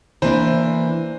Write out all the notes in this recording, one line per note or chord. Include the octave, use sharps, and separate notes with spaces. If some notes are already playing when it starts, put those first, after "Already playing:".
E3 A#3 D4 C5